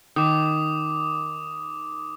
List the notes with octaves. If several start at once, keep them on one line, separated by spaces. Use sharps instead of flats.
D#3 D6 D#6